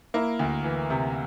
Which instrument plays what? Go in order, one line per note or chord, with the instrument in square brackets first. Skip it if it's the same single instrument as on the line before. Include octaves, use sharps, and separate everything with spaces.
[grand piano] A#3 E4
D2
E3
C3